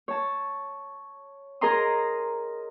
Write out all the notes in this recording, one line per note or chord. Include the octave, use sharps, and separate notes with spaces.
C#5 A5
G#4 A#4 D#5 A#5 C6 D#6